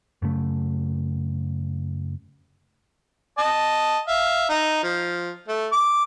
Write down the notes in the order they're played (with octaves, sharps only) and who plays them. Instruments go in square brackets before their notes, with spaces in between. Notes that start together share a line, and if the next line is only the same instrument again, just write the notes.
[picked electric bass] F#2 C#3 A3
[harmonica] D#5 A5
E5 F5
D#4
F3
A3
D6